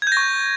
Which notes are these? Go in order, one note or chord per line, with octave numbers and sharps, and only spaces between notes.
C#6 G6 G#6 A#6